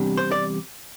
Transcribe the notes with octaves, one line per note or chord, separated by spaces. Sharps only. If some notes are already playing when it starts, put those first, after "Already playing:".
Already playing: E2 C3 G3 D4
C5
D5